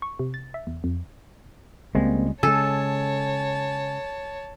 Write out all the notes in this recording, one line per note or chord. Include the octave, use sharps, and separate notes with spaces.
C#6
C3
A6
E5
E2
F2
C#2 G3 G#3 A#3 C4
C#3 G#3 A4 C#5 G#5 A5